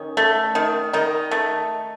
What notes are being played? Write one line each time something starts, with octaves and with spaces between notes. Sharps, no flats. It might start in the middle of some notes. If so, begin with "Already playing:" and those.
Already playing: D#3 C#4
A3
D#3
D#3 D#4
A3